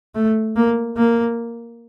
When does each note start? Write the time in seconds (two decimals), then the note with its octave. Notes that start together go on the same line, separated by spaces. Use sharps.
0.15 A3
0.56 A#3
0.97 A#3